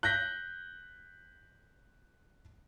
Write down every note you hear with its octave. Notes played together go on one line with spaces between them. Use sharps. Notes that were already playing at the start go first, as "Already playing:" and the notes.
F#6 G6 A#6 B6